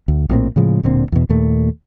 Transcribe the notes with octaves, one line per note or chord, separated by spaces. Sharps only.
D2
A#1 A2 A#3 C4
A2 C#3 F3 G#3
D1 A#2 D3 C4
E2 B2
D#2 A#2 A3